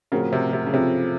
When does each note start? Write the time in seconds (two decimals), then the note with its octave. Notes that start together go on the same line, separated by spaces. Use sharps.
0.12 A2 C#3 F3 C4 F#4 A#4
0.33 C3
0.53 C3
0.66 C#3
0.73 C3 F3 C4 F4 A4